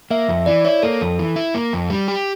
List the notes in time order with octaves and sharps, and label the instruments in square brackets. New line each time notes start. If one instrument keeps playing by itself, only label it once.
[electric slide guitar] A#3 [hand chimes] E5
[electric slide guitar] F2
[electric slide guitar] E3 [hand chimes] D5
[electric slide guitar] E4 [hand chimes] C#5
[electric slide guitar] A#3 [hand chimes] A4
[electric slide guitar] F2 [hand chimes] A4
[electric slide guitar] E3
E4
A#3
F2
G3
G4